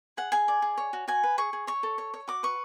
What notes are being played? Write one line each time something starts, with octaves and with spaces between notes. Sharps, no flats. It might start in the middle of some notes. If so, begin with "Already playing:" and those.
G#4 F#5
G#4 G#5
D5
G#4
C#5
F#4
F#4 G#5
B4
G#4 C#6
G#4
C#5 C#6
A4
C#5
C#5
F#4 D6
B4 C#6